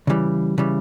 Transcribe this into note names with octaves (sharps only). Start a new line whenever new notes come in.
C#3 E3 G3
C#3 E3 G3